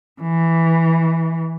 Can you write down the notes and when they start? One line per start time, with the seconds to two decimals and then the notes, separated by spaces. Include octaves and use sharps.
0.22 E3